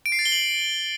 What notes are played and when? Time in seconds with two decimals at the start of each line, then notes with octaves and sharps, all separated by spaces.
0.06 D7
0.12 C7
0.19 A6
0.26 G7
0.32 F#7